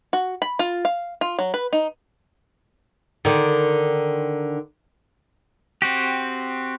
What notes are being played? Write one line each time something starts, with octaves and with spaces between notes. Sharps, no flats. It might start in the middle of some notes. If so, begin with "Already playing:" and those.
F#4
B5
F4
F5
F4
F#3
B4
D#4
D3 D#3
C4 F#4 G4